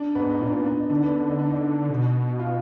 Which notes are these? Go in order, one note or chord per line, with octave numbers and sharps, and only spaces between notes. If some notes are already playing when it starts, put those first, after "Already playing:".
Already playing: D4
G#2 B3
D#4
A#2 D4
B3
D4
D#4
D3 D4
B3
D4
D#4
D4
D#4
B2
F4